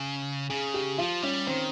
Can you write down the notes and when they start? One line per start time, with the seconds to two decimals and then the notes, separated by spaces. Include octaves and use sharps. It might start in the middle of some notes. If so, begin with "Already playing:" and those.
Already playing: C#3
0.49 C#3 G#4
0.74 G4
0.98 F3 F4
1.22 G3 C#4
1.47 D#3 C4